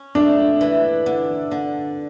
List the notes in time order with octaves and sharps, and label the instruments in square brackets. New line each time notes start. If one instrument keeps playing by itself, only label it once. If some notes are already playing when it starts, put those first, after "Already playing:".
Already playing: [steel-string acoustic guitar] C#4
[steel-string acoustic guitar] A3 [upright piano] D4
[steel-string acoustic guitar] E3
D3
D3